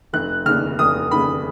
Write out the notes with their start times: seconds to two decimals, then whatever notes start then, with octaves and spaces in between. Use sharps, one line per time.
0.13 F1 F#6
0.46 D#2 C#3 F6
0.79 F1 D#6
1.11 D#2 C#3 B5